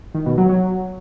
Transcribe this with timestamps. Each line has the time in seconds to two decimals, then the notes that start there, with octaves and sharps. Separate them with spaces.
0.14 D#3
0.26 B2
0.38 F#3
0.49 F#3